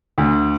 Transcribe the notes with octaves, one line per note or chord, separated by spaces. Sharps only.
D2